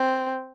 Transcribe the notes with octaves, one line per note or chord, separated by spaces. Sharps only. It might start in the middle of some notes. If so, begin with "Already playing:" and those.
Already playing: C4